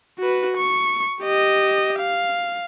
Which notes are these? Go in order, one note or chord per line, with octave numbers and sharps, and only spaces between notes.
F#4 B4
C#6
G4 D#5
F5